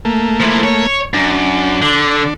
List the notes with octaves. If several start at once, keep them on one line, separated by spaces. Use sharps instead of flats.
A3 A#3
F3 E4
C#5
F#2 D4
D3